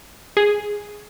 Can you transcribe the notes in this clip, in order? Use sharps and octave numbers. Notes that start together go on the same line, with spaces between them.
G#4